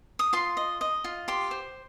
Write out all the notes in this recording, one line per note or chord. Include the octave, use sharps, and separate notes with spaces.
D#6
F4 C6
D#5
D#5
F4
G4 C6
C5